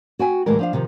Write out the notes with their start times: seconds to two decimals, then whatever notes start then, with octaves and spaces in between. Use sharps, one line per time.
0.19 F#4 G5 G#5
0.46 D2 A2 E3 G3 G#3 A#4
0.59 F3 D4 F5
0.73 C3 D#3 F3